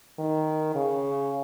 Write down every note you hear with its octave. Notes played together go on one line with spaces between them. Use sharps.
D#3
C#3